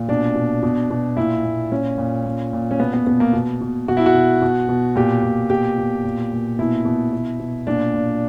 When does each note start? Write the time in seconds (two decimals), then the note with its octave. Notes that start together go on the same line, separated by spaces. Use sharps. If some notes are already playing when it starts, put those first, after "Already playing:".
Already playing: A#2
0.08 B2 D4
0.35 B2
0.63 B2
0.90 B2
1.17 A#2 E4
1.45 A#2
1.71 A#2 C#4
1.98 A#2
2.26 A#2
2.53 A#2
2.71 C#4
2.80 B2 B3
2.93 B3
3.06 B2 B3
3.20 A#3
3.33 B2
3.61 B2
3.88 B2 F#4
3.97 E4
4.06 F#4
4.14 B2
4.42 B2
4.69 B2
4.96 A#2 G4
5.23 A#2
5.50 B2 G4
5.78 B2
6.04 A#2
6.32 A#2
6.59 B2 E4
6.85 B2
7.13 B2
7.40 B2
7.67 A#2 D4
7.94 A#2